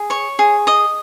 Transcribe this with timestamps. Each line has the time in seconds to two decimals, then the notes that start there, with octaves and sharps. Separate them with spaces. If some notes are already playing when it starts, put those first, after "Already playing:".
Already playing: G#4
0.10 C#5 C#6
0.39 G#4
0.67 D#5 D#6